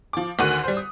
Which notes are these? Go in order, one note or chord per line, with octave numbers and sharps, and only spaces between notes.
F3 D6
D2 D3 D#3 F#4 F#6 D#7
G3 C5
D#6